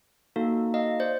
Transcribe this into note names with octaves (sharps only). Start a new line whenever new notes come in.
A#3 D#4 F#4 A4
D#5 F5
C5 D5